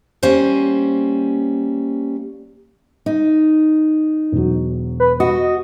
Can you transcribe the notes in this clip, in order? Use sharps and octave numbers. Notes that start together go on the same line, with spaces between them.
G3 A#3 C#4 C5
D#4
E1 F#3
B4
F#4 D#5